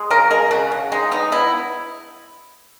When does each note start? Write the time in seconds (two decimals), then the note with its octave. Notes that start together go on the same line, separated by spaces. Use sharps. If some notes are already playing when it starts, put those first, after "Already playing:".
Already playing: G#3
0.10 C#3 A#4
0.30 G#3 A#4
0.51 C#3 F#4
0.72 C#3
0.92 G#3 D#4
1.11 B3 D#4
1.32 B3 E4